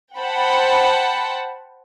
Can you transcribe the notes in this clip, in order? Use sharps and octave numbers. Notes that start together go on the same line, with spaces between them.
C5 F#5 G5 A5 B5